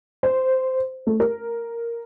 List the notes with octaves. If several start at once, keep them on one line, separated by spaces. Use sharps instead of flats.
C5
A3
A#4